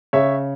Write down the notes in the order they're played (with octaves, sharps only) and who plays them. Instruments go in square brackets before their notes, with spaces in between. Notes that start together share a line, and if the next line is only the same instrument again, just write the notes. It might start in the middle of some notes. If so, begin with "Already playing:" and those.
[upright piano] C#3 C#5 E5